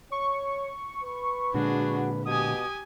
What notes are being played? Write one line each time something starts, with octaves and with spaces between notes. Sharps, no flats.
C#5 C#6
B4
A#2 D3 G#3 D4 F#4 G#4
B2 G4 G#5 D#6